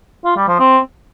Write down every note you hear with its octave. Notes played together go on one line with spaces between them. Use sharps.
F4
G3
F3
C4